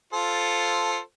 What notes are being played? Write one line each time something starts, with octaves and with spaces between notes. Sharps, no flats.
F4 A4 C5